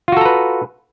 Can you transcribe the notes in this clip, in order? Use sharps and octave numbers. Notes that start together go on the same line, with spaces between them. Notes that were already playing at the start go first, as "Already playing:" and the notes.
F4 F#4 A4 B4 A#5